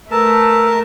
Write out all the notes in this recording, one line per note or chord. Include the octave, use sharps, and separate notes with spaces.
A3 A#4 B4 A5 E6